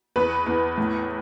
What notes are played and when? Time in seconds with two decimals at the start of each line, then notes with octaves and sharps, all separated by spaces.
0.16 E2 B4
0.46 E2
0.78 A2